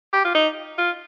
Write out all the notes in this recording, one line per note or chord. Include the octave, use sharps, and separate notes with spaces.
G4
F4
D#4
F4